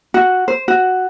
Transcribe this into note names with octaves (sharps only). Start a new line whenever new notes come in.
F#4
C5
F#4